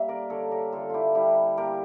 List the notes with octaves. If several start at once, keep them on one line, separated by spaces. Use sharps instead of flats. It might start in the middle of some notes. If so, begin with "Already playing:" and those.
Already playing: G3 A#3 E5
A#4 D5
D3 A4 C#5
G4 A#4
D3 F4 A4
E4 F4 G4
G3 E4 G4
A#3 G4 A#4